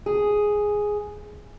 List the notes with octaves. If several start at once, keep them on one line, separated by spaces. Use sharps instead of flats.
G#4